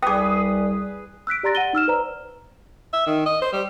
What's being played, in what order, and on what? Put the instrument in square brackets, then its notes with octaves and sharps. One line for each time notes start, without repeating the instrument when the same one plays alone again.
[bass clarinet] C2 [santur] G#4 B4 [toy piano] G5 D6 [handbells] D#6
[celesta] E6 F#6 B6 D7
G4 D5 A#5 C6 A6 A#6
F#5 D#7 G7
D#4 E6 F6 E7
B4 C5 D5 A#5
[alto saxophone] E5
D#3
D#5
C5
G3